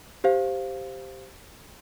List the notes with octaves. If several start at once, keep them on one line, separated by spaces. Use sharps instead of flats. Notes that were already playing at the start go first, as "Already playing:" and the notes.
G4 C5 F5